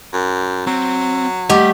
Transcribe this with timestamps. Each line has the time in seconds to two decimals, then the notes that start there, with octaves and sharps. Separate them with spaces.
0.13 F#2
0.67 F#3 C4
1.50 G3 A3 G4 D#5 F#5 D6